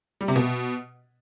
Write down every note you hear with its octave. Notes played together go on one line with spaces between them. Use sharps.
G3
C3
B2